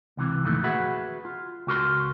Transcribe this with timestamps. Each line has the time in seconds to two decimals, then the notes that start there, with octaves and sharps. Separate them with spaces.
0.17 C#2 C3 E3
0.44 F2 A#2 D#3 E3 A3
0.64 F#4 G#4 B4 E5 F#5
1.25 F4
1.67 C#2 F#4 A#4 C6